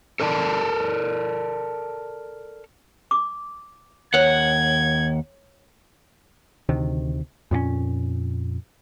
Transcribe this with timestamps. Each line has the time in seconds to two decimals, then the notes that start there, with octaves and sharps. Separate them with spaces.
0.20 A4 A#4 D5 F#5 A5
3.11 D6
4.14 D#2 C5 C#5 F#5 G#6
6.69 D2 C3 D#3
7.51 F2 A#2 B3 C#4